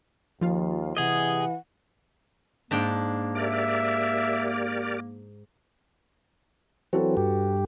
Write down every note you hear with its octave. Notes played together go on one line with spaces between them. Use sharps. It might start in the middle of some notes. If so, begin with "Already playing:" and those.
D#2 F3 F4 F5
C3 E3 G4 G#4 D#5 F#5
G#2 A#3 D4 G5
G4 A#4 D5 E5
E3 F#3 C4 F#4 A4 B4
G2 G4